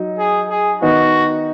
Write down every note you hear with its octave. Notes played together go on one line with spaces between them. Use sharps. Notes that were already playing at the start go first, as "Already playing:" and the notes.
Already playing: F#3 D#4
G#4
G#4
D#3 B3 D#4 F#4